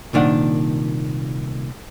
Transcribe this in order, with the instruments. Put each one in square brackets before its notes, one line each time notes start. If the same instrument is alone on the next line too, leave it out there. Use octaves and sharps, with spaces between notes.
[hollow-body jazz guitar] C2 A#2 D#3 D4 F#5